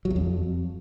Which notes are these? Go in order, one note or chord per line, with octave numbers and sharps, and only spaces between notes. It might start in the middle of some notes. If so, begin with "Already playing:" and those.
F#3
E2
F2